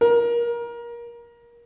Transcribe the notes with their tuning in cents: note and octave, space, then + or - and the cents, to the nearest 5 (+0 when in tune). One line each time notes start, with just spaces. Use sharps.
A#4 +25